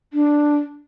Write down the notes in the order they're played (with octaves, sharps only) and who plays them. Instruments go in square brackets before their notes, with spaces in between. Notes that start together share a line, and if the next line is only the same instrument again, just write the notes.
[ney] D4